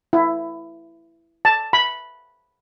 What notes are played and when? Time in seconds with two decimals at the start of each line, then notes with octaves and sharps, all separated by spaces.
0.13 E4
1.45 A5
1.73 B5